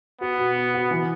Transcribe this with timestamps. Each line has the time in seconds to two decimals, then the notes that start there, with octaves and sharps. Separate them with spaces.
0.21 B3 F#4
0.38 B2
0.56 B2
0.74 F#4
0.91 E3